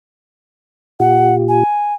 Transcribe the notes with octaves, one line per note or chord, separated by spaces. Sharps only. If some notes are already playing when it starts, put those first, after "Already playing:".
A#2 F4 G4 F#5
G#5